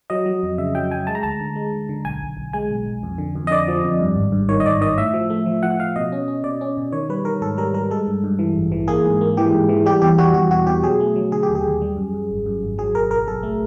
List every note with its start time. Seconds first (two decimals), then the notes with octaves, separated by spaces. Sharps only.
0.10 F#3 D#5
0.26 F#3
0.43 F2
0.58 C#3 E5
0.75 F#3 G5
0.91 F#3 G#5
1.07 G#3 A5
1.15 A#5
1.23 D2 A5
1.41 D3
1.56 G#3
1.73 D3
1.89 D3
2.05 B1 G#5
2.22 B1
2.37 B1
2.53 G#3 G#5
2.71 B1
2.86 B1
3.03 F2
3.18 D3
3.35 F2
3.47 D#5
3.51 D3 D5
3.68 F3
3.84 F2
4.00 G2
4.16 G#1
4.32 G2
4.49 D#3 C#5
4.60 D#5
4.66 G#1 D5
4.81 D#3 D#5
4.98 A2 E5
5.14 F3
5.30 A3
5.46 F3
5.63 F3 F#5
5.79 F3 F5
5.96 B2 D#5
6.12 C#4
6.28 C#4
6.44 B2 D5
6.61 C#4
6.77 B2
6.92 D#3 C#5
7.09 G3 B4
7.25 D#3 A#4
7.41 G#2 A4
7.58 G3 A#4
7.74 G3 A#4
7.91 G#3 A4
8.08 G2
8.24 G2
8.39 E3
8.56 A1
8.72 E3
8.88 A#3 G#4
9.05 G#2
9.21 A#3
9.37 E3 G4
9.53 G#2
9.69 E3
9.86 G3 G4
10.02 E2 G4
10.18 G3 F#4
10.34 E2 F#4
10.51 B2 F#4
10.67 B2 G4
10.83 F#3 G#4
11.00 A3
11.16 F#3
11.32 D3 G#4
11.43 G4
11.49 D#2
11.55 G#4
11.65 D#2
11.82 G3
11.97 F#2
12.14 F#2
12.30 G#1
12.46 F#2
12.63 G#1
12.78 F#3 G#4
12.95 B1 A#4
13.11 B1 A#4
13.27 B1 A4
13.43 A3